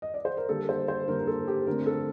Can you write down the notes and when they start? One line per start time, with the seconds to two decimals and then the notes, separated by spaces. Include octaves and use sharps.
0.02 D#5
0.14 D5
0.25 C5
0.37 A#4
0.49 D3 G3 A#3 A4
0.69 C5
0.88 C5
1.08 D3 G3 A#3 A#4
1.19 A#4
1.27 A4
1.48 G4
1.67 D3 A3 C4 A#4
1.86 A4